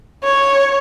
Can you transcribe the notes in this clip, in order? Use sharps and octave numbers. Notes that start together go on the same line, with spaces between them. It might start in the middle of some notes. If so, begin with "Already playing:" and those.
C#5